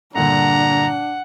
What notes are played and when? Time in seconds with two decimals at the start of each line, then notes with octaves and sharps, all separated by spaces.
0.15 G2 A#2 D3 D4 F#5 A#5